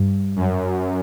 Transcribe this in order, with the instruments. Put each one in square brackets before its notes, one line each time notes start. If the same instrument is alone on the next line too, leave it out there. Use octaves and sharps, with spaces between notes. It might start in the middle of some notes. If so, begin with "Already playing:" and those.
Already playing: [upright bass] G2
[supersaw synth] F#2